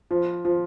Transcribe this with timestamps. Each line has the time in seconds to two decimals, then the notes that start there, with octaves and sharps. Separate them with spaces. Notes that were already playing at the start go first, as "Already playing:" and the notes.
0.11 F3
0.45 F3